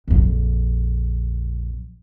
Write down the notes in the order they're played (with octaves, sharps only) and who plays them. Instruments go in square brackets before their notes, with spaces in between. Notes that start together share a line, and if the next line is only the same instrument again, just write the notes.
[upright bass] A#1 F2